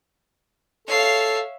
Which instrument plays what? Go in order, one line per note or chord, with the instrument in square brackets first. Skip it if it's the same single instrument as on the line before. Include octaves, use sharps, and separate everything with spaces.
[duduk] A4 [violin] C#5 C7 [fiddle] E5 F5